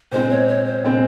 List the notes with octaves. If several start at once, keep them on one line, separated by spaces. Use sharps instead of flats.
A#2 G#3 C4 C5
C#5
C#5
C5
A#2 G#3 C4 C5